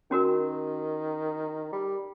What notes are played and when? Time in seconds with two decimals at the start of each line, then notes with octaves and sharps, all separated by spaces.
0.11 D#3 C#4 F#4 A#4
1.73 G3